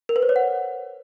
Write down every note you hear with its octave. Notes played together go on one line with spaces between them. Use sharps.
A#4
B4
C5
C#5
F#5